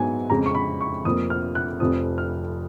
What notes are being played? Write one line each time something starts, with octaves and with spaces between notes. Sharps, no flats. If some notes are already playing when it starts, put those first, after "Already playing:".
Already playing: G#2 F#3 B3 G#5
F2 C#3 G#3 A#5
C#6
B5
C#6
F1 F2 F3 A#3 D#6
F6
F#6
F1 F2 F3 D#6
F6